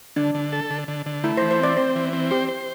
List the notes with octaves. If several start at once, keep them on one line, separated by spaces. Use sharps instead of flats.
D3 D4
D3
A4
D3
D3
D3
A3 E4
E3 C5
C5
C4 D5
C4 C5
E3
C4
G4 C5
C5